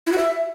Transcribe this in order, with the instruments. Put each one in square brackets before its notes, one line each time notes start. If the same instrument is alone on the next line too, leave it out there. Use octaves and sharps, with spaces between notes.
[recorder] E4
F#4
E5